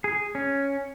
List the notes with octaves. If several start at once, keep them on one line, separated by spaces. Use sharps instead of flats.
G#4
C#4